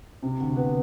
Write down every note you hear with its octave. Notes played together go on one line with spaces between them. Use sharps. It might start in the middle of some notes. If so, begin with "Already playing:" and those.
C3
D2
B3